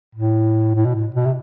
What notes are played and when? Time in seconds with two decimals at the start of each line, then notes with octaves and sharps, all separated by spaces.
0.15 A2
0.75 A2
0.85 B2
0.95 A2
1.16 B2
1.25 C3